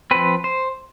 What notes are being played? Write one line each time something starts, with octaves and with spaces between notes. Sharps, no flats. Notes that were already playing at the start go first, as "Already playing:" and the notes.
F3 C4 B4
C5